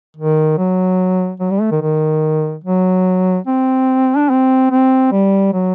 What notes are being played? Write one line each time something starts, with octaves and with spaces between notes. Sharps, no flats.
D#3
F#3
F#3
G3
A3
D#3
D#3
F#3
C4
D4
C4
C4
G3
F#3